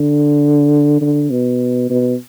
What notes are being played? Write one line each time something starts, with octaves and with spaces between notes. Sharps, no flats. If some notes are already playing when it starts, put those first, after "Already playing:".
Already playing: D3
D3
B2
B2